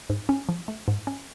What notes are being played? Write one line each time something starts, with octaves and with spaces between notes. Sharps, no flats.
G#2
C#4
F3
A3
G#2
C#4